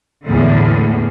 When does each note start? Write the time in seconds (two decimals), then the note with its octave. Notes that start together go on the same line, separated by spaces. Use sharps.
0.25 E2 A2 D3